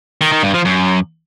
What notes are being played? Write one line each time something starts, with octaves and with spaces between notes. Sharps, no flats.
D#3
D#3
G2
F3
F#2